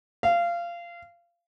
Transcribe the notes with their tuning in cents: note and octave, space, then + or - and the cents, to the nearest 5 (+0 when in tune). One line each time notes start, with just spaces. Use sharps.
F5 -20